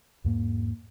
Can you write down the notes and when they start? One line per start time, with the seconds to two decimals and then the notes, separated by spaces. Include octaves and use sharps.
0.24 E2 G#2 A#3